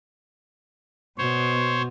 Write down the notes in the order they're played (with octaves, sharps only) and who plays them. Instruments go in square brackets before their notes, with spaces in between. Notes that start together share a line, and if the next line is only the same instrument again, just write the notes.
[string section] B2 [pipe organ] C5 C#5